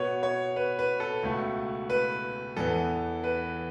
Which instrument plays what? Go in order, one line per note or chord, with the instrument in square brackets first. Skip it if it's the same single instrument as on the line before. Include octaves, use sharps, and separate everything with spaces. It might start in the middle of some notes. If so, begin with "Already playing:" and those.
Already playing: [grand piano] B2 B3 C#5
C#5
B4
B4
A4
C#2 B2 A3
B4
E2 E3 B3 A4
B4